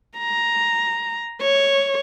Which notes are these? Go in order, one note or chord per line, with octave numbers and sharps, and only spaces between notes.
A#5
C#5